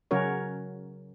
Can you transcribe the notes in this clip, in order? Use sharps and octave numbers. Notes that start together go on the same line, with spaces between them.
C#3 F#3 C#4 F#4 A#4 C#5